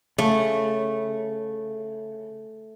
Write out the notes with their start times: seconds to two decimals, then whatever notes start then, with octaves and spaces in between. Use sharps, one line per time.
0.18 C#3 A3